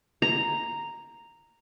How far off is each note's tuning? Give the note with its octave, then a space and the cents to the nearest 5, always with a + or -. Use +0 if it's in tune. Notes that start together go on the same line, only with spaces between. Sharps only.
A#5 -5